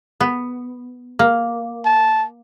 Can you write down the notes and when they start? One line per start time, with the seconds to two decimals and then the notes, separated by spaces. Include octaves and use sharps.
0.21 B3
1.19 A#3
1.85 A5